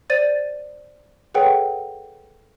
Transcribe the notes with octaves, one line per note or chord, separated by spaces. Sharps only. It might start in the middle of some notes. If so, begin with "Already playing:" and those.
C5 D5 A6 D#7
G#4 A4 B4 C#5 F#5 G5